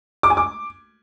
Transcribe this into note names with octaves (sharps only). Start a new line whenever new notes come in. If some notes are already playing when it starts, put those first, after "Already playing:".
D6
G#5
D6